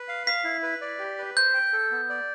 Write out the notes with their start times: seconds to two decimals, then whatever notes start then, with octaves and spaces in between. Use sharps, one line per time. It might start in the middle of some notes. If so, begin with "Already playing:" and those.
Already playing: B4
0.08 F5
0.27 F5 B6
0.44 E4
0.63 B4
0.81 D5
0.99 G4
1.18 B4
1.36 C5 G6
1.54 G5
1.73 A4
1.91 B3
2.09 D5